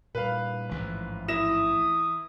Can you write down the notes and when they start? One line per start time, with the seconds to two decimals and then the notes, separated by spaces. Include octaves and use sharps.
0.15 G2 A#2 B4 F5
0.71 A1 G#2 E3 F3
1.28 E4 D#6 A#6 E7